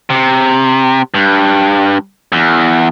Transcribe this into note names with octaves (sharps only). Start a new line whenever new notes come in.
C3
G2
E2